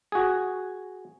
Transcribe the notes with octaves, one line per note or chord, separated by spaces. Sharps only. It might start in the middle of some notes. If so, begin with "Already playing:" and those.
F#4 G#4